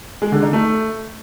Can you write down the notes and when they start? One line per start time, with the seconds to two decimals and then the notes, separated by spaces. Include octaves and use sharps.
0.22 G#3
0.32 D3
0.42 D#4
0.53 A3